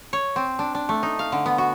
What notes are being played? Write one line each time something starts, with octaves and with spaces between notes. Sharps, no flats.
C#5
C4
D4
D4
A3
D#4
F5
D3
B3
F#4